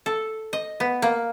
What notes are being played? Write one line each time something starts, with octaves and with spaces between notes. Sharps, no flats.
A4
D#5
B3
A#3